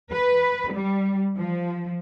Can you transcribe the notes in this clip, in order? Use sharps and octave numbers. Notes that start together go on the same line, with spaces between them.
B4
G3
F3